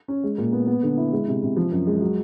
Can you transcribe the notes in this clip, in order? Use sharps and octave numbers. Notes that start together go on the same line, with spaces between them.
C#4
G#3
A#2
B3
B3
D3
E4
G#3
C3
C3
F3
F#2
G#3
F#3